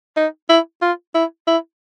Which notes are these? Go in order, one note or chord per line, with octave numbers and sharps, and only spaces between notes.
D#4
E4
F4
E4
E4